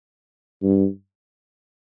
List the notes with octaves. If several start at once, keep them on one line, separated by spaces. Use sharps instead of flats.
G2